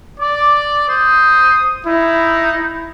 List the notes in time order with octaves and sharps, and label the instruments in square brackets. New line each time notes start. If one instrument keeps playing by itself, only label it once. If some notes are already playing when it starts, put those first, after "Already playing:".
[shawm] D5 [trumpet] D6
[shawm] C5 [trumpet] D#6
[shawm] D#4 [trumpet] E4